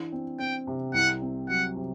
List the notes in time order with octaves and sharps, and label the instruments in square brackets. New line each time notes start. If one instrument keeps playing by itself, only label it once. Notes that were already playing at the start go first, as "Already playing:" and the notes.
Already playing: [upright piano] E3 D4
C4
[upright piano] C4 [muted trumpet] G5
[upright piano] C3
[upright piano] C2 [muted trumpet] F#5
[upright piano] C4
[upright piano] F#3 [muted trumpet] F#5
[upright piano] C3